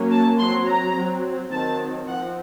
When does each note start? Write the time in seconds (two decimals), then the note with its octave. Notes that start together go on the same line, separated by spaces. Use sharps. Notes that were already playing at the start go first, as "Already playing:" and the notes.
Already playing: F#3 A#3 C#4
0.11 A5
0.38 F#3 C4 C6
0.67 A#5
0.95 F#3 C4
1.52 D#3 F#3 C4 A5
2.08 F3 C4 F#5